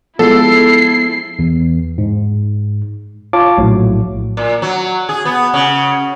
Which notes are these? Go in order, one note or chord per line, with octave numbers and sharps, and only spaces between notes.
F3 G#3 B3 E4 A4 C7
E2
G#2
F4 C#5 F5 A5 D6
A#1 A2 F#3
A#2
F#3
G#4
B3
C#3